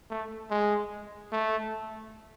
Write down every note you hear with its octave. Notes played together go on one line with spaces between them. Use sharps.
A3
G#3
A3